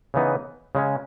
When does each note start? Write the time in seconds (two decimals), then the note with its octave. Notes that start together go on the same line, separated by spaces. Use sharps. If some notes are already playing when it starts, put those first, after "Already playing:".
0.14 C#3 E3 B3 D#4
0.75 C#3 G#3 C#4